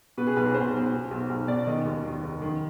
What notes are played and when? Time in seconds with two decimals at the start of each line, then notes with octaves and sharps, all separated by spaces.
0.18 B2 B4
0.27 G#4
0.36 B1 B4
0.45 G#4
0.54 B2 C5
0.73 B1
0.93 B2
1.11 B1
1.29 B1
1.48 B2 D5
1.67 D#3 D#5
1.85 D#2
2.04 D#3
2.23 F1
2.42 D#3